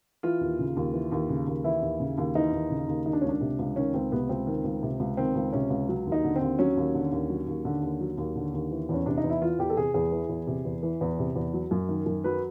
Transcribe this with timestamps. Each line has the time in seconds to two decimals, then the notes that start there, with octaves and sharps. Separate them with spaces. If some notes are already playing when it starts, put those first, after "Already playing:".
0.23 E3 F4
0.41 D#2
0.59 C#3
0.76 D#2
0.93 E3
1.12 D#2
1.29 C#3
1.47 D#2
1.64 E3 E4
1.82 D#2
2.00 C#3
2.18 D#2
2.35 E3 D#4
2.52 D#2
2.70 C#3
2.88 D#2
3.06 D#3 D#4
3.13 D4
3.21 C#2 C#4
3.29 D4
3.41 C3
3.59 C#2
3.76 D#3 C#4
3.94 C#2 C4
4.12 C3 B3
4.29 C#2 C4
4.47 D#3
4.64 C#2
4.82 C3
5.00 C#2
5.17 D#3 C4
5.35 C#2
5.53 C3 C#4
5.70 C#2
5.89 F#3
6.07 D#2
6.12 D#4
6.24 D3
6.36 C4
6.41 D#2
6.59 F#3 C#4
6.77 D#2
6.94 D3
7.12 D#2
7.30 F#3
7.48 D#2
7.65 D3
7.83 D#2
8.00 F#3
8.18 D#2
8.36 D3
8.53 D#2
8.71 E3
8.89 E2 C#4
9.06 C3 D4
9.18 D#4
9.24 E2
9.30 E4
9.41 E3 F4
9.59 E2 G4
9.70 A4
9.77 C3 G#4
9.94 E2 G#4
10.12 E3
10.29 E2
10.47 C3
10.65 E2
10.83 E3
11.01 E2
11.19 C3
11.36 E2
11.54 F#3
11.71 F#2
11.89 D#3
12.06 F#2
12.24 F#3 B4